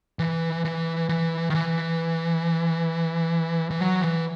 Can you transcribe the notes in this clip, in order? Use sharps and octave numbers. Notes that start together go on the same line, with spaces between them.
E3
E3
E3
D#3
E3
E3
F#3
E3